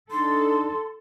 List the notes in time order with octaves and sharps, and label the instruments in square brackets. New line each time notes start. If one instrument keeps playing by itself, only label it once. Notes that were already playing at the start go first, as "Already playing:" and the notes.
[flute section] D4 D#4 [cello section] A4 [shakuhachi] C6